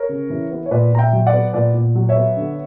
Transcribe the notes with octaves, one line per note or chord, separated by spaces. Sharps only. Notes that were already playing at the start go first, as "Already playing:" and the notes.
Already playing: A#4 C#5
C#3
E3
B3
C#5
A#2 B4 D5
A#2 A#5
E5 G5
F#3
D5 F#5
B3
A#2 B4 D5
A#2
F#3
C#5 E5
B3
D3